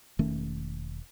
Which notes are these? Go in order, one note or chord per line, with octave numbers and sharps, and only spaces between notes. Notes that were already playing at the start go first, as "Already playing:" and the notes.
E1 D#3 A3 C#4